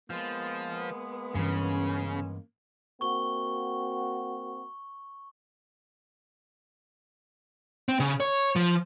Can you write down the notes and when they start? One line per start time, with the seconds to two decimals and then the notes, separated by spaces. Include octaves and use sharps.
0.10 F3 G#3 A#3 B3
1.35 G2 C#3 E3 C#4
3.01 A#3 C4 F#4 C#6 G7
7.89 C4
8.00 C#3
8.20 C#5
8.56 F3